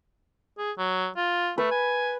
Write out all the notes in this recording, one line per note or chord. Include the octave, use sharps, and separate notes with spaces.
G#4
F#3
F4
A3 B4
G#5